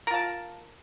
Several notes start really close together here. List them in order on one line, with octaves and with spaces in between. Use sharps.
A#4 F4 A5